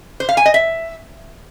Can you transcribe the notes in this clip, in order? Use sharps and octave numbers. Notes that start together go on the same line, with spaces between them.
C5
F5
G#5
D#5
E5